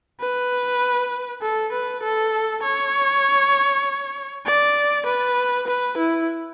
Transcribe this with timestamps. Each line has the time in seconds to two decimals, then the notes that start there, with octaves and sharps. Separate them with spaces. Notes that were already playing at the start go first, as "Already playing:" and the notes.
0.20 B4
1.42 A4
1.73 B4
2.03 A4
2.63 C#5
4.46 D5
5.06 B4
5.68 B4
5.98 E4